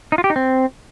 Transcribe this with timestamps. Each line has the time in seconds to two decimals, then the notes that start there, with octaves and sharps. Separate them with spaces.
0.12 D#4
0.18 F4
0.24 G4
0.30 D#4
0.36 C4